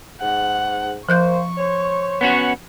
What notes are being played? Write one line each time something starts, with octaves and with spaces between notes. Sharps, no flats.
G#2 F#5
F3 A#3 C5 C#6 F#6 G6
C5 C#5
B3 C#4 F#4